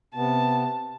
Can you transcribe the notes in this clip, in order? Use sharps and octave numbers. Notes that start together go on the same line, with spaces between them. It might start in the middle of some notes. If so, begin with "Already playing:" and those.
C3 B3 A5